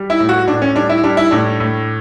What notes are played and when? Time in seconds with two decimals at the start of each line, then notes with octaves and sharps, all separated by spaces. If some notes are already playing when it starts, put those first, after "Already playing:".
Already playing: G3
0.10 E4
0.20 A2
0.29 F#4
0.47 A2 D4
0.62 C#4
0.75 G3 D4
0.89 E4
1.04 G3 D4
1.17 E4
1.31 A2 D4
1.60 A2